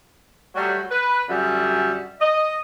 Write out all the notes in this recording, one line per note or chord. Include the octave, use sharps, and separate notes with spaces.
F#3 G3 A3
B4
F#2 D3 G3 F#4 G#4 E5
D#5